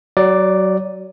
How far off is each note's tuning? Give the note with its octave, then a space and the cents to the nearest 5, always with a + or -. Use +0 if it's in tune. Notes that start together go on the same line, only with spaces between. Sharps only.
F#3 +20 D5 +0